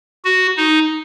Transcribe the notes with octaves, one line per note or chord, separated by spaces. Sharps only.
F#4
D#4